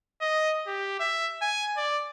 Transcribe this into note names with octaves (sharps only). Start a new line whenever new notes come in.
D#5
G4
E5
G#5
D5